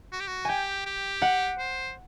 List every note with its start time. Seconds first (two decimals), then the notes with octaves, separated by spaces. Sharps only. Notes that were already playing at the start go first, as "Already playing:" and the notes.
0.12 F#4
0.20 G4
0.27 F#4
0.45 G4 G5 G#5
0.85 G4
1.22 F#5
1.59 C5